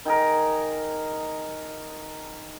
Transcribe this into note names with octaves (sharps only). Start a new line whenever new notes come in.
D#3 G#4 A#4